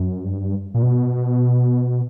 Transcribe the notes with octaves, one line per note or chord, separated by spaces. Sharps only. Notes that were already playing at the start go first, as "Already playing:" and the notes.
Already playing: F#2
G2
A#2
B2